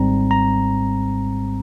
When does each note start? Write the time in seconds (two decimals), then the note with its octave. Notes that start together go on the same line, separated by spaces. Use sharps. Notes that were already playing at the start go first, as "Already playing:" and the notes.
Already playing: G#1 G#2 G3 C4 A#5
0.31 A#5